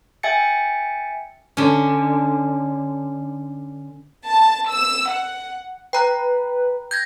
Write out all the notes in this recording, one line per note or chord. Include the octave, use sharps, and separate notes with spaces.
E5 G5 G#5 A6 C#7
D3 C#4
A5
E6
F#5
B4 G5 A#5 F#6
G6 G#6 A#6